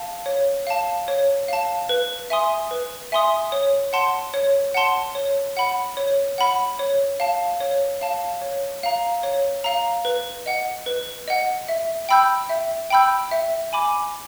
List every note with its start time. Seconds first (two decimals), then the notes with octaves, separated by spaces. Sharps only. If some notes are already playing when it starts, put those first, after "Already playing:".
Already playing: F5 A5
0.26 C#5
0.67 F5 A5
1.08 C#5
1.48 F5 A5
1.89 B4
2.30 E5 G#5 C6 D#6
2.71 B4
3.12 E5 G#5 C6 D#6
3.52 C#5
3.93 F#5 A5 C6
4.34 C#5
4.74 F#5 A5 C6
5.15 C#5
5.57 F#5 B5
5.97 C#5
6.38 F#5 B5
6.79 C#5
7.20 F5 A5
7.60 C#5
8.01 F5 A5
8.42 C#5
8.83 F5 A#5
9.23 C#5
9.64 F5 A#5
10.05 B4
10.46 D#5 F#5
10.86 B4
11.28 D#5 F#5
11.69 E5
12.09 G5 B5 E6 G6
12.49 E5
12.90 G5 B5 E6 G6
13.31 E5
13.73 G#5 B5 D6